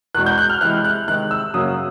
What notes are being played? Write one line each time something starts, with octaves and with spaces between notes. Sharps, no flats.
E2 B2 G#3 F#6
G6
F#6
F6
C3 E3 G#3 F#6
F#6
C3 D#3 G#3 F#6
E6
F#2 C#3 F#3 A#3 D#6